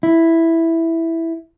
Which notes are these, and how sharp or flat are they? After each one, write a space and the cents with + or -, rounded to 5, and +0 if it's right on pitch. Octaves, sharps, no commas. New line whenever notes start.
E4 +0